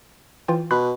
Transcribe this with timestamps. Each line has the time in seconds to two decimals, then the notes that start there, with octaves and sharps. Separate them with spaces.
0.48 E3 F4 G5
0.71 B2 B5 C6 F#6